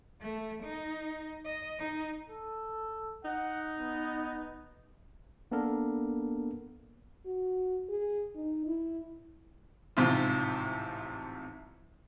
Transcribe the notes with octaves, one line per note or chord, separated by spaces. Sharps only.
A3
D#4
D#5
D#4
A4
D#4 F#5
B3
A#3 B3 D4 A4 A#4
F#4
G#4
D#4
E4
A1 G#2 C3 F3 F4